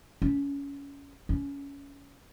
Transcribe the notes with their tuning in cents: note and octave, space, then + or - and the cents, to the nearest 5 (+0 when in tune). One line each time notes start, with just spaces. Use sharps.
C#4 +20
C#4 +20